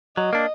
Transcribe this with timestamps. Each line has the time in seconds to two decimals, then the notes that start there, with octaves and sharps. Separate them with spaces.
0.17 F#3 D#5
0.33 A#3 D4